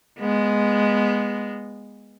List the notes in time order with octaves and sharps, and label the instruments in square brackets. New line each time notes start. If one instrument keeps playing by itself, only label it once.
[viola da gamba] G#3 B3